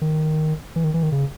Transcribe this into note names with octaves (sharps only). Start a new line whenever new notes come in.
D#3
E3
D#3
E3
D#3
C#3